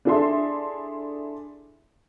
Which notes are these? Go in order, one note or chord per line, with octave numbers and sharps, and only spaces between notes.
D4 E4 G#4 A4 E5 C6